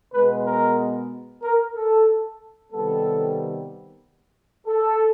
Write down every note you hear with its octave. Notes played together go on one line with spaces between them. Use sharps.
B2 G#3 B3 B4
A#4
A#4
A4
C3 D#3 G3 B3 A4
A4